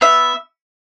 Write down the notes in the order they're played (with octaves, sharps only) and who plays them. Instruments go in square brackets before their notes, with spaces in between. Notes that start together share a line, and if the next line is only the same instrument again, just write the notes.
[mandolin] B3 E5